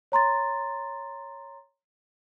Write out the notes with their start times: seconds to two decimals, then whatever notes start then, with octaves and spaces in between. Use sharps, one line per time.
0.12 C#5 A#5 C6 A6